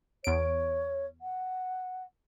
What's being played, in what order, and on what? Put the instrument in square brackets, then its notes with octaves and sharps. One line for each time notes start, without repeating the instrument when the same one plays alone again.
[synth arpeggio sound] E2 D7 [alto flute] C#5
[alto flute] F#5